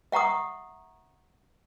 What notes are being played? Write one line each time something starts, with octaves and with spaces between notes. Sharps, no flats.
E5 F#5 A#5 C#6 D#6